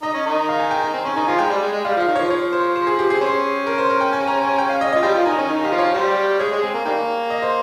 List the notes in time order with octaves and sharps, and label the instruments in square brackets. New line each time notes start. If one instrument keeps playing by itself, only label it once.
[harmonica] D#4 [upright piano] D#5
[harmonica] C#4
D#3 D#4
[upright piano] F5
G#5
G5
G#5
[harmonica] C4
[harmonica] C#4 [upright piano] G#5
[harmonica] D#3 D#4 [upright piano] G#5
[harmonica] F3 F4 [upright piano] G#5
[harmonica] G#3 [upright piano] G5
[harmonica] G3
G#3
G#3
[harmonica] G3 [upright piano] F5
[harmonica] F3 [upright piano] F5
[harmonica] D#3
[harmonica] F3 [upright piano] C#5
[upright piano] C#5
C5
C5
G#4
G4
[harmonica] C4 [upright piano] G#4
[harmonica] C#4 [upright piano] C5
[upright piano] A#4
C5
A#4
G5
G#5
A#5
G#5
G5
F5
D#5
[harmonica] F4 [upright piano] D#5
[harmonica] G3 G4 [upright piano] G5
[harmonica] F3 F4
[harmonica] D#3 D#4 [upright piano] G#5
[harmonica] C#4
[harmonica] D#3 D#4 [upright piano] G#5
[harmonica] G4 [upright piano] F5
[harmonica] F3 F4
[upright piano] C#5
[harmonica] G3 G4 [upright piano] C5
[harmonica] G#3 G#4 [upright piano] C#5
[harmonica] G#3 G#4
[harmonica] C4 [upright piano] G#5
[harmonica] A#3
[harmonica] D#3 G3 A#3 [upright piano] G5
[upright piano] D#5
C5